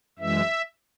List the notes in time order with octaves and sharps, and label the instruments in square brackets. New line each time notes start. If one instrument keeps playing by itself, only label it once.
[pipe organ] F#2 E3 G#3 E5